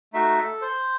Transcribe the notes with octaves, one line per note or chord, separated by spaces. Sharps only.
A3 D#4 F#4 E5
A4
C5